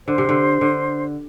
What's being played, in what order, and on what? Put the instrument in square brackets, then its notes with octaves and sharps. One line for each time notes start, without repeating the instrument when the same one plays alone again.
[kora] D3 [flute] C5
[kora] C3
D3
D3